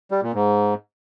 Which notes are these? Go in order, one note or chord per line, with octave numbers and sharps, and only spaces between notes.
G3
A#2
G#2